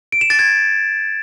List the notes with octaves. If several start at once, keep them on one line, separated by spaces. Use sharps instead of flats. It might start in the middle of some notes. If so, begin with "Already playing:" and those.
D7
E7
A6
G#6